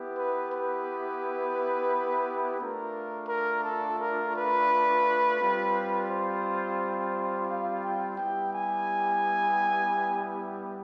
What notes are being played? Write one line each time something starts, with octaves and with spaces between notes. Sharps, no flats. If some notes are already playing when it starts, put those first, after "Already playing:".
Already playing: B3 E4 G4
B4
B4
A3 D4 F4 A#4
A#4
A4
A#4
B4
G3 C4 F4
C5
F5
G5
G3 B3 E4 G4 G5
G#5